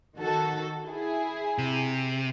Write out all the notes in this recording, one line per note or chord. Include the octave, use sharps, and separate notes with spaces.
D#3 F#4 A4
E4 G#4
C3